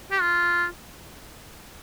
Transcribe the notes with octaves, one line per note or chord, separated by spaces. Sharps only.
G4
F4